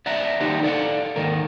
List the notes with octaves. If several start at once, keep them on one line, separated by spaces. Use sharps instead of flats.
D5 E5 F#5 A#5
D#3 G3 D#4 G4 C5
A4 D5 F5 F#5
D#2 G#2 D#3 A#4